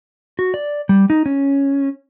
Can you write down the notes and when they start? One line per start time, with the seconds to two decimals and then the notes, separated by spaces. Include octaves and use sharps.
0.39 F#4
0.54 D5
0.89 G3
1.10 D#4
1.26 C#4